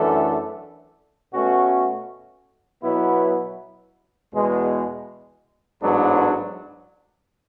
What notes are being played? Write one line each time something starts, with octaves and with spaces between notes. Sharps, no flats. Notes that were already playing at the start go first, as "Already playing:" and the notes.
Already playing: F#2 E3 A3 D4 A4
B2 A3 C#4 F#4
B2 F#3 B3 E4
E2 B2 G#3
A1 G#2 F#3 B3 D4